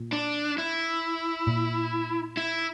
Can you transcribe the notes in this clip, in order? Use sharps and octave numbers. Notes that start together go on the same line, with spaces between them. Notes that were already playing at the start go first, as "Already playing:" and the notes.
Already playing: A#2
D4
E4
A#2
E4